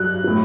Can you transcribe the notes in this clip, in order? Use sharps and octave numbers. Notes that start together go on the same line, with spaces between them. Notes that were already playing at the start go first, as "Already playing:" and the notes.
Already playing: G2 F#3 F#6
A2 F#3